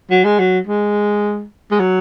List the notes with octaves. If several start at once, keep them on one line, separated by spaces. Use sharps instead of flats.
F#3
G#3
F#3
G#3
G#3
F#3